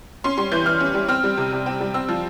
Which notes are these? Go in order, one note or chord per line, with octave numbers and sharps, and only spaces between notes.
C#4 C6
G3 C6
E3 G6
E3 F6
C#4
G3
C4 F6
G3
C3
C3
C4
G3
C4 E6
F3